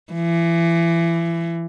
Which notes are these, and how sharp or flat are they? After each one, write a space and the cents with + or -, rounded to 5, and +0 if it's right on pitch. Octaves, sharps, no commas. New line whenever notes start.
E3 +30